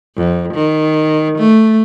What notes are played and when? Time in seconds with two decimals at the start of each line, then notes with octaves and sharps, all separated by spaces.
0.17 F2
0.54 D#3
1.38 A3